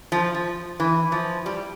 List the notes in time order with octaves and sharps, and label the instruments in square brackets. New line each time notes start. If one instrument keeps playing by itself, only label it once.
[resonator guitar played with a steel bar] F3
F3
E3
F3
G3